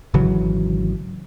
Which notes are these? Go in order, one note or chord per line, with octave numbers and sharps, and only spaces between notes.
G#1 C#3 E3 F#3